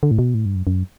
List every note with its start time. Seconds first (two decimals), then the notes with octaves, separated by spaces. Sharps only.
0.03 D3
0.11 A2
0.19 B2
0.34 A2
0.46 G2
0.56 F#2
0.67 F#2